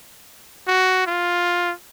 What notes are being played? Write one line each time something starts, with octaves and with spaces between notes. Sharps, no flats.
F#4
F4